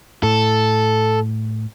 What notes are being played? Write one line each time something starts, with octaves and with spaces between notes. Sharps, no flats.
A2 A4